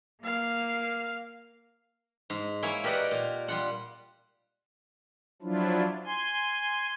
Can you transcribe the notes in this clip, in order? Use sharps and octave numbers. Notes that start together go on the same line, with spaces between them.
A#3 F5
G#2
A#3 E4 C#5 G#5
G4 A#4 B4 D5 D#5 F#5
A#2
G3 F4 F#5
F3 F#3 D4 E4 F4
G#5 C6